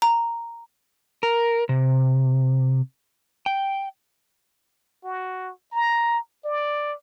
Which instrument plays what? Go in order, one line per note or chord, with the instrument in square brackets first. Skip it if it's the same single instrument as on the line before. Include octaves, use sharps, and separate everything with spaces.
[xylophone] A#5
[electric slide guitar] A#4
C3
G5
[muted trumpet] F#4
A#5
D5